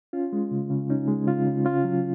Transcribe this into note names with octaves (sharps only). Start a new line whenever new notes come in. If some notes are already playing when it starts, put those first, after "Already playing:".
C#4 F4
G#3
C#3
C#3
C#4 D#4
G#3
C#3 F4
C#3
C#4 F4
F#3